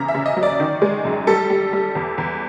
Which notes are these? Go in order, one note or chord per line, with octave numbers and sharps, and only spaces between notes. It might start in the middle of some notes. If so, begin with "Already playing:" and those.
Already playing: E2 C#3 A#5
E5
C#3
D#5
F#3
D5
D#3
G#3
F#2
G3 A4
G3
G3
E2
E2